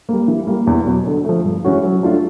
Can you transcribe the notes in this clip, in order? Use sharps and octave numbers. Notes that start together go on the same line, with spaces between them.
G3 A#3
E3
G3 A#3
E2
B2 F#3
D3
F3 A3
G2
E3 G#3 C#4 F#4
F#3
A3 D4 F4